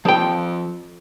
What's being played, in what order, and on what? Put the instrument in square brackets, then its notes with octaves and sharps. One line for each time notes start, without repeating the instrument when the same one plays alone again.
[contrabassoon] F2 [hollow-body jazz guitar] F3 G5